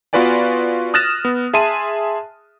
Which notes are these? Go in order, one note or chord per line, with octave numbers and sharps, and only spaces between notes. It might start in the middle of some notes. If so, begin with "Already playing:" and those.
B3 F4 F#4 B4 D5 G#5
D#6 F6 F#6 A6 A#6 E7
B3
G#4 E5 A5 C6 D#7